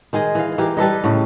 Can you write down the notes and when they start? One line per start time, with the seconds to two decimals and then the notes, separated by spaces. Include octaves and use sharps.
0.13 D#3 G#3 G#4 D#5
0.35 E3 F5
0.58 E3 G4 A#4
0.77 G3 A4 B4 D#5
1.04 A2 C#3